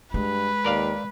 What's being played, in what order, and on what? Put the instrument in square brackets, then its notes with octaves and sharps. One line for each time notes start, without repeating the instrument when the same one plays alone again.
[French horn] G2 [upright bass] G#3 [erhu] B4
[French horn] D#2 [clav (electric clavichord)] A#4 D5 F5